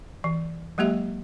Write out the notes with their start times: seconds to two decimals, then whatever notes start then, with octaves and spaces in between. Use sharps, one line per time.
0.24 E3
0.78 F#3 G#3 A#3 G4 E5